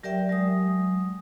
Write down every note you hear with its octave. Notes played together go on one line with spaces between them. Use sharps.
F#3 G4 A#4 D5 E5 G5
F#3 G#3 D#6